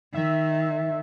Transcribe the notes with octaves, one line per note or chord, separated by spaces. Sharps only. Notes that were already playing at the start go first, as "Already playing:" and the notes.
D#3 E5